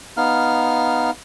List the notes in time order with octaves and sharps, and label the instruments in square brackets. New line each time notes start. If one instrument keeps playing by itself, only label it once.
[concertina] B3 D#4 F5 F6